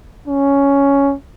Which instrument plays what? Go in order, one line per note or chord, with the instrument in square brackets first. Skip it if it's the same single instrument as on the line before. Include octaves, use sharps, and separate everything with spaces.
[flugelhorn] C#4